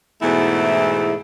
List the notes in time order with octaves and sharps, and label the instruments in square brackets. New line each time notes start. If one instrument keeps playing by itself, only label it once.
[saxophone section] E2 G#2 B2 A3 E4